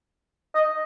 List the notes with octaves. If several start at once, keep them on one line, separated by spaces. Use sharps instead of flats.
D#5